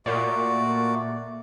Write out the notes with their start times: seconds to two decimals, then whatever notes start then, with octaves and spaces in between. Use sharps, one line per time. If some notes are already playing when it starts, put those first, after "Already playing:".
0.06 A#2 A3 F#4 D5